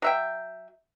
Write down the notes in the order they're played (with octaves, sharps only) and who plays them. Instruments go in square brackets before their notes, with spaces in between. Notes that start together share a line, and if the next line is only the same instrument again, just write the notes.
[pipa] F#3 E5 G5